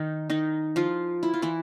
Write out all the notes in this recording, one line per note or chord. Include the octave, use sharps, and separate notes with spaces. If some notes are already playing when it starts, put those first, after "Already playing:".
Already playing: D#3 D#4
D#3 D#4
F3 F4
E4
F4
E3 E4